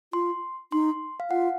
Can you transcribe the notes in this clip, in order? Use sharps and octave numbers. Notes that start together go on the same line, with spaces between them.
F4 C6
D#4 C6
F5
F4 F#5